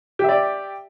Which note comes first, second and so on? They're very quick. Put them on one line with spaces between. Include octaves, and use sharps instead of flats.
G4 E5 D5